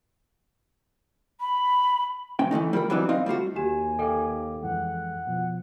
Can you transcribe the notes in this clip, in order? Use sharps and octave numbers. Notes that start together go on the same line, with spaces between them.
B5
B1 C#4 G5
E3 G#3 A3 D#4
G3 F4 A#4 B5
E3 F#3 G3 C4 D4 D#4
C4 D#4 D#5 F5
G3 A3 F4 F#4
D#2 F#4 G4 G#5 E7
A4 D#5 F5 G5 D6
F2 E3 G#3 F#5
B2 F3